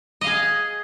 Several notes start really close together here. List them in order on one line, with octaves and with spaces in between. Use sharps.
D#5 F5 G#4